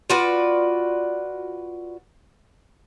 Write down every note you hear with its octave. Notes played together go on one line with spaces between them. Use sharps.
F4 F#4 B4 D5